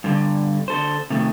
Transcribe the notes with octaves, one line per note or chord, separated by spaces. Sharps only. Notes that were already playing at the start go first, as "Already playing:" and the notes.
G2 D3
D3 A4 C5
C3 D#3 A3